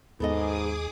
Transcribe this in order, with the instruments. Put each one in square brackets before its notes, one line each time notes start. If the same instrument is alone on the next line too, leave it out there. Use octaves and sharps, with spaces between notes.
[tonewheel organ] D#2 [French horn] G#2 [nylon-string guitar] B3 A4 D#5 [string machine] G#4 D6 D#6